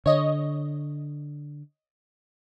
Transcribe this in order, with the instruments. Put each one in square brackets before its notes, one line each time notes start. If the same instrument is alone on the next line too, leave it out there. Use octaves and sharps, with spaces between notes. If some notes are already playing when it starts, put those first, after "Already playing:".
[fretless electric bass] D3 [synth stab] C#5 D#5